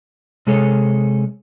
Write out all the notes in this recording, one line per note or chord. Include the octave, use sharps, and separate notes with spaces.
C3 G#3 G#4 A4 C#5